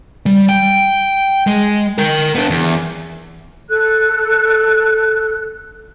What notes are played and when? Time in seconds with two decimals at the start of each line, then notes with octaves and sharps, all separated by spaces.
0.26 G3
0.49 G5
1.47 G#3
1.98 A#4 G5
2.35 B3 D4
2.50 E2
3.70 A4 F#6